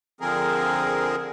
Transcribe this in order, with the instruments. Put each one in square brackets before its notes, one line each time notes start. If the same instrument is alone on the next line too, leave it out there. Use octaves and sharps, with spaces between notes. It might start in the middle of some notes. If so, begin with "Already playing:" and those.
[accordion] D3 F3 C4 G#4 A#4